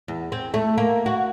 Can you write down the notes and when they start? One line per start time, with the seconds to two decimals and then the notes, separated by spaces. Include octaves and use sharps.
0.08 E2
0.32 C4
0.54 A3
0.78 A#3
1.06 F#4